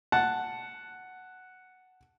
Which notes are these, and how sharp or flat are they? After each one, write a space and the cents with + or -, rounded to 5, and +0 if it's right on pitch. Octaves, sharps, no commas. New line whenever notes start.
F#5 +0 A5 +0